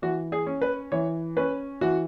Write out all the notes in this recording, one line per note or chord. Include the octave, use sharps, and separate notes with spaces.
E3 F#4
G#4
C#4
B4
E3 C#5
C#4 B4
E3 F#4